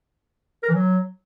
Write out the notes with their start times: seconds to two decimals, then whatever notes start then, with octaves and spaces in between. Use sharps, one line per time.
0.63 A#4
0.69 E3
0.74 F#3